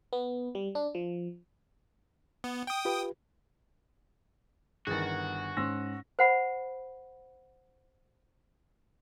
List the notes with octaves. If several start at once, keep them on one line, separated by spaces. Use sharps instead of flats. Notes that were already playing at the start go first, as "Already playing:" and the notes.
B3
G3
D4
F3
B3
G5 D#6
F4 G4 B4
G1 D#3 E3 F#4 G#4 A6
G#2 C#4 C6 E6 A#6
C5 F#5 B5